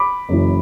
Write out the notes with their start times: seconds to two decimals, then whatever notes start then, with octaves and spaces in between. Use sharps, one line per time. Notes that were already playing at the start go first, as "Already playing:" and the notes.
Already playing: B5 D6
0.29 F#1 F#2 E3